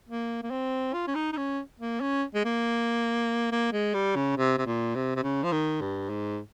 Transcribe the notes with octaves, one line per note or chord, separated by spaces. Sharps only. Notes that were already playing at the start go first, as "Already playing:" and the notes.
A#3
A#3
C4
F4
C#4
D#4
D#4
C#4
A#3
C#4
G#3
A#3
A#3
G#3
G3
C#3
C3
C3
A#2
C3
C3
C#3
F3
D#3
G2
G#2